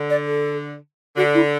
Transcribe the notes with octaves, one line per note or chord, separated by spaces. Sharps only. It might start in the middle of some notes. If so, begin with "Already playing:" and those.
Already playing: D3
D5
A4
D3 F#4
E4